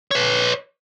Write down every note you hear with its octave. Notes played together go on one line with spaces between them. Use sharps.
B4 C#5